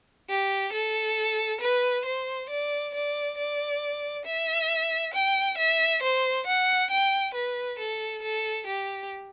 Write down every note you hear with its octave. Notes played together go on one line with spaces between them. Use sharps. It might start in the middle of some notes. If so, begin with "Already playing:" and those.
G4
A4
B4
C5
D5
D5
D5
E5
G5
E5
C5
F#5
G5
B4
A4
A4
G4